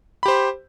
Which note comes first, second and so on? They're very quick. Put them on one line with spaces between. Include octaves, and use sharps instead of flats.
B5 G4 C5